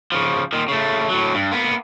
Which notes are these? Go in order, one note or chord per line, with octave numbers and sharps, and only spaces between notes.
C#3 F3
A#2 D#3
C#3 A3
A2 F#3
G2
A#3 B3